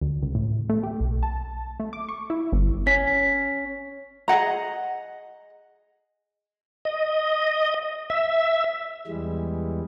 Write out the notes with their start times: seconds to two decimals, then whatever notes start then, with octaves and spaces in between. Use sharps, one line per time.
0.01 D2
0.22 C#2
0.35 A2
0.69 A3
0.83 G4
1.00 B1
1.23 A5
1.80 A3
1.93 D6
2.09 C#6
2.30 E4
2.52 G1
2.87 C#4 B6
4.28 G#4 D#5 F#5 A#5
6.85 D#5
8.10 E5
9.07 E2 E3 G3 G#3